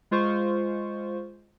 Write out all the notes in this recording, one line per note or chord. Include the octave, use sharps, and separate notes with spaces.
G#3 F4 C5 C#6